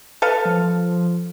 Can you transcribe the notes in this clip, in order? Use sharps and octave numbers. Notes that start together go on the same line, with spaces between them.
A4 B4 F5 F6
F3